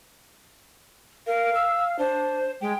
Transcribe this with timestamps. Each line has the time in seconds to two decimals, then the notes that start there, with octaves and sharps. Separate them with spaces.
1.27 A#4 F5
1.55 E6
1.99 D4 C5
2.61 G#3 G5